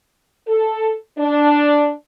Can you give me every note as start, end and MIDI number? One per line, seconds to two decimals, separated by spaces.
0.48 0.94 69
1.18 1.92 62